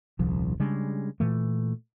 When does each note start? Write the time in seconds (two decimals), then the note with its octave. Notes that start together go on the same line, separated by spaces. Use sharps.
0.19 D#1 C2 F3
0.60 C#3 G3 G#3 D4
1.20 A#2 E3 A3